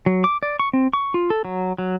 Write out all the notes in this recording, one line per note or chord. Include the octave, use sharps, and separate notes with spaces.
F#3
D6
D5
C#6
C4
C#6
F4
A4
F#3
F#3